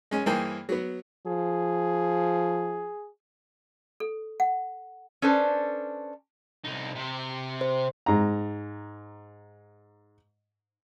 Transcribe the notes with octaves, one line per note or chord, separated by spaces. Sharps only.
G#3 C#4
G2 E3 A#3 G#4 C5 G5
F#3 B3
F3 G#4
A4
F#5
C#4 D4 A4 B4 C5
C2 D#4
C3 G4
C5
G#2 A#5